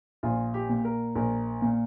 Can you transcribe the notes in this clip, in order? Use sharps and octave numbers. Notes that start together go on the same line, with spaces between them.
A#1 F4
G4
A#2
A#4
A#1 A#4
A#2